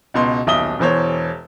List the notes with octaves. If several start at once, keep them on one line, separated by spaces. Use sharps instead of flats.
C#2 B2 C6
D#1 B1 E5 D#6 G7
E1 E2 C5 C#5